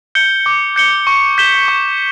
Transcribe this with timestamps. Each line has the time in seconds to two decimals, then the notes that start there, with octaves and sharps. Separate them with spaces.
0.15 G6 C#7 G7
0.46 D6
0.76 G6 C#7 G7
1.07 C#6
1.38 G6 B6 E7 G7
1.68 C#6